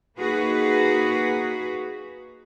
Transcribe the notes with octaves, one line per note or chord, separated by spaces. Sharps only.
A#3 D#4 F#4 G#4 B4